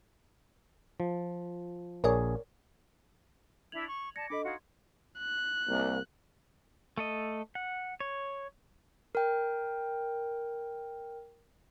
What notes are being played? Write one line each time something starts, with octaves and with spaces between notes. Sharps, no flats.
F3
A#1 G#4 A#4 C#5 D5
D4 E4 E5 G#6 F7 F#7
C#6
D5 A5 G#6 A#6 C#7
D4 A4 D#5 B5 D6
D#4 F#4 F5 C6 G#6
F#6
C2 A#3
A3 A4 D#5
F#5
C#5
A#4 G5